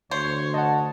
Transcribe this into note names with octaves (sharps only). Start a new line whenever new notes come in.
D2 C5 C#5
D#5 F#5 A5